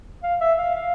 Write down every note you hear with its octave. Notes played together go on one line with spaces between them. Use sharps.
F5
E5
F5
F5